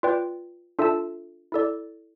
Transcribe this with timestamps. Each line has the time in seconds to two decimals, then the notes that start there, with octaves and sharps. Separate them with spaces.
0.03 F4 B4 D5 G5
0.79 D4 F4 A4 E5 A5
1.52 E4 A4 D5